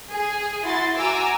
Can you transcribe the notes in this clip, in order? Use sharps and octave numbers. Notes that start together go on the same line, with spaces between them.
G#4
E4 F#4 C6 A6
F#4 G#5 A#5 D6 E6